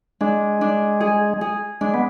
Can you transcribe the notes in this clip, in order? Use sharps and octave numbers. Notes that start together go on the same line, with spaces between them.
G#3 D4
D4
G#4
G#4
G#3 D4
B3